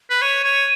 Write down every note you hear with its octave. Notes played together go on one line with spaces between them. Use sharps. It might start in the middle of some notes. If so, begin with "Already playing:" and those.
B4
C#5 D#7
C#5